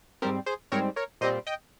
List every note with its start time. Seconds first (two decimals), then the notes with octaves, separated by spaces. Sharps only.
0.22 G#2 G3 C4 G4 A#4
0.46 G#4 C5
0.72 G#2 G3 C4 A#4 C#5
0.96 A#4 C#5
1.21 A#2 G3 C4 C5 D#5
1.47 D#5 G5